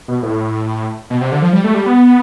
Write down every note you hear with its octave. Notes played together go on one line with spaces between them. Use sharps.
B2
A2
B2
C3
D3
F3
G3
A3
G3
B3